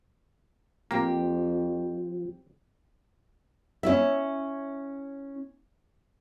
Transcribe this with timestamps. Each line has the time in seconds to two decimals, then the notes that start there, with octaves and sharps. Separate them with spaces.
0.91 F2 F3 A#3 C4 G4
3.83 C#4 E4 E5